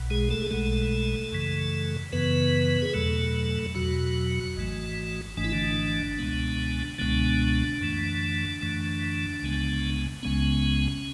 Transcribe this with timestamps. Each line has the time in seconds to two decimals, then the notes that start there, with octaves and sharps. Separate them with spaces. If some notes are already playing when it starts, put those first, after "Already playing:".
Already playing: B1 B2
0.10 G#3 G#4
0.30 A3 A4
0.42 G#4
0.51 B1 B2 G#3 A3 A4
1.32 F#2 C#3 E3
2.13 F#2 C#3 E3 B3 B4
2.82 G#4
2.93 E2 B2 F#3 A3 A4
3.75 E2 B2 F#3 F#4
4.56 G#1 G#2 E3 A3
5.37 G#1 G#2 E3 A3 D4
5.44 E4
5.52 D3 D4
6.18 C#2 B2 G#3 B3
6.98 C#2 B2 D3 G#3 B3 D4
7.81 F#2 E3 A3
8.61 F#2 E3 A3
9.42 C#2 C#3 G#3 B3
10.23 C#2 C#3 G#3 B3 C#4